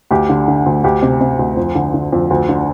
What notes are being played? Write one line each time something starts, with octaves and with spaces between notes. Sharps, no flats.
D2 G4
D3
D3
D2
D2 G4
C3
C3
D2
F2
D3
D3
F2
D2
D3